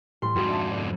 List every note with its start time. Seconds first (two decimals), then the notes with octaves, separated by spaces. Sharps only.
0.22 A2 E3 G3 C6
0.36 F2 G#2 G3 F#4 G4
0.48 D4 E5 A5
0.71 F#1 B2 D3 D5